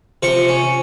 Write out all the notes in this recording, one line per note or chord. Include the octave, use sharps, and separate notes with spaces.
C3 F3 C#6
C#4